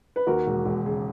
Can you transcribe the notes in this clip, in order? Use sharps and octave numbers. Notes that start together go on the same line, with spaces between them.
B4
D#2 F#4 A#4
E1
E1
C#3